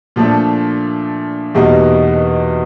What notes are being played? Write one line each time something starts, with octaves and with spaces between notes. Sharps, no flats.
A#2 F3 A3 D4
E2 B2 G3 A#3 D#4